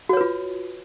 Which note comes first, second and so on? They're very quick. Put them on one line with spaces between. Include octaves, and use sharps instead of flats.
F#4 C#5 B4 F4